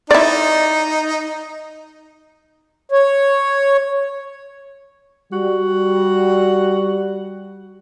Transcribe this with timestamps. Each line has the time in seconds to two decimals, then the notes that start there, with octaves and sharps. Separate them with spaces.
0.11 D#4 E4 D5
2.92 C#5
5.33 G3 F#4